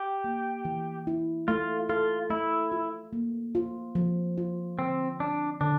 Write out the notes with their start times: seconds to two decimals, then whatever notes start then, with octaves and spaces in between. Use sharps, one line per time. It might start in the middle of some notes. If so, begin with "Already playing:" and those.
Already playing: G4
0.24 A#3
0.65 E3
1.07 E4
1.48 A3 F4
1.89 F4 A4
2.30 A3 E4
2.72 F4
3.13 A#3
3.55 F4
3.95 F3
4.38 F4
4.78 D3 C4
5.20 C4 D4
5.61 D3 D4